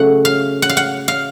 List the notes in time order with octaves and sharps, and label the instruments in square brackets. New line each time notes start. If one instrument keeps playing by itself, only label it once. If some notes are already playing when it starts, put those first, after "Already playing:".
Already playing: [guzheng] C#3 F#3 A3 F#5
F5
F#5
F5
F#5
F5